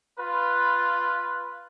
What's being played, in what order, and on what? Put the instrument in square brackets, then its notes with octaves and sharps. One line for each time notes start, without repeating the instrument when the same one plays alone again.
[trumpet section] F4 B4